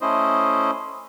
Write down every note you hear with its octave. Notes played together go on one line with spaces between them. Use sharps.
A3 C#4 E4 C5 D#5